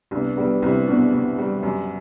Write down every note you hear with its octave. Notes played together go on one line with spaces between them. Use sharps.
C2 B3 D4
G3 B3 D4
C2 C4 E4
B2 B3 D4
B2
G3
F#2